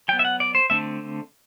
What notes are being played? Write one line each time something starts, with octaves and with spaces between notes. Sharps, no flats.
F#3 B3 G5
E5
F#5
D5
C5
D3 A3 C4 E5